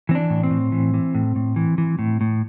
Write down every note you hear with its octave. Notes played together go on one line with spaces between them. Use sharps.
E3 C4
D4
A2
C4
A2
E3
E3
A2
A2
E3
E3
A2
A2